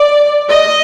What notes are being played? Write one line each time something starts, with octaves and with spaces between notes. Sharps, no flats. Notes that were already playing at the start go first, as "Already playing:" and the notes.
Already playing: D5
D#5